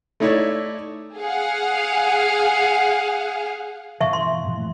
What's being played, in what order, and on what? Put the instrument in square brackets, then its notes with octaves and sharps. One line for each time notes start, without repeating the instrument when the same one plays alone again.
[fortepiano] A3 D#4 E4 C#5 D5 E5
[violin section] G#4 F5 F#5
[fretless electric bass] G2 B2 E3 [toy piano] E5 F5 C#6
[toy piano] C6
[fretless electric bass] G2 A#2 E3
G2 E3 A3